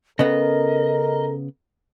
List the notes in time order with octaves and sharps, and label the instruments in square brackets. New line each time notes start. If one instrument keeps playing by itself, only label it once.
[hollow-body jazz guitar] C#3 B3 [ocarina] A4 [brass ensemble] A#4 [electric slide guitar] D#5